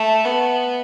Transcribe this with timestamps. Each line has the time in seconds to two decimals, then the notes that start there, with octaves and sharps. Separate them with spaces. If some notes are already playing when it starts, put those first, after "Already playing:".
Already playing: A3
0.25 B3